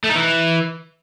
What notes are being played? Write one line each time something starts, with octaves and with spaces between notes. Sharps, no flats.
A3
D#4
E3